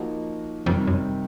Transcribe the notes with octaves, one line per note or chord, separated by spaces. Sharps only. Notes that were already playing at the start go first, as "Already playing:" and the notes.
Already playing: F3 A#3 D#4 F#4
F2 C3 D#3 G3
F#2